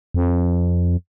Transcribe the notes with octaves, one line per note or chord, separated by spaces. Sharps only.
F2